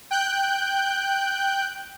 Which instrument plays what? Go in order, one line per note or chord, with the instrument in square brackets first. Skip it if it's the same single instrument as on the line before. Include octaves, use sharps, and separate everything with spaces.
[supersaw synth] G5 F#6 G6